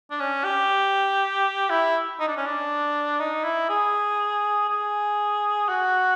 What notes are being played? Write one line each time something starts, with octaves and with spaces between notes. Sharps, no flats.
D4
C#4
G4
E4
D#4
D4
C#4
D4
D#4
E4
G#4
G#4
F#4